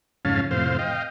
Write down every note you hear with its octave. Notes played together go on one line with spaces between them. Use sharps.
F2 G#2 C#3 C#4 F5 A5
F2 A2 C3 C5 F5
D#5 F5 G5